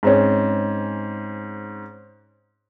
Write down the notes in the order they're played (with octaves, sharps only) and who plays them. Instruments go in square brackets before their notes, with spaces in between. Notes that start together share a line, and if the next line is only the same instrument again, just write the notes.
[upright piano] G#2 C4 C#4